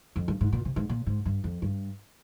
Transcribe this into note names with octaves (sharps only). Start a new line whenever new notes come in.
F2
G2
G#2
A#2
C3
G#2
A#2
G#2
G2
F2
G2